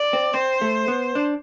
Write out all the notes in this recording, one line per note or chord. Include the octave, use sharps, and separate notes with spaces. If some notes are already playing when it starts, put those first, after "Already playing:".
Already playing: D5
C4
C4 C5
A3
B3
D4